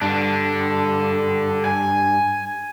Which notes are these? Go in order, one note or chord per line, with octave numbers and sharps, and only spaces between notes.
G2 D3 D4
G#5